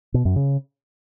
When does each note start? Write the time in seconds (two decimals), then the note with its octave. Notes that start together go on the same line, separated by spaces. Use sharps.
0.14 B2
0.25 F#2
0.36 C#3